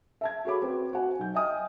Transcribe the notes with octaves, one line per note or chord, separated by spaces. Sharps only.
E5 A5 G#6
F#4 G#4 A4 C#5 B5 D6
C4 F#4 B4
F#4 C5 F#5 G#5
B1 G6
D#5 E5 G5 G#5 D#6 F6